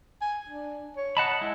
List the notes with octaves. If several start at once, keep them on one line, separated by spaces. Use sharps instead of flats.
G#5
D4
C#5
D#5 F#5 A5 B5
G#3 E4